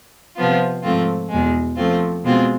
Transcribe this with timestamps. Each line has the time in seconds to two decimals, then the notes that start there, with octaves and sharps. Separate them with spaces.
0.37 C3 F3 B3 F4
0.83 G#2 F3 A3 C4 F4
1.30 E2 B2 G#3
1.76 F3 A3 C4 F4
2.24 B2 G#3 C4 F4